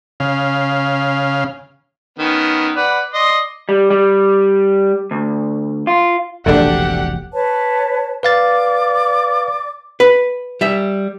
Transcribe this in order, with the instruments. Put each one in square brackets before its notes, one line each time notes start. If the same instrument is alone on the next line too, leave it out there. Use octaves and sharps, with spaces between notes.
[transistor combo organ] C#3 F5
[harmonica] D#3 B3 C#4
B4 D5 F#5
D5 D#5 C6
[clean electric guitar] G3
G3
D2
F4
[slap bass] E1 A#1 C3 [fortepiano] A3 D4 [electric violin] G4 F#5
[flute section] B4 C#5 A5
[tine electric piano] B4 F5 A6 [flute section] D5 D6
[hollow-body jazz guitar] B4
G3 E5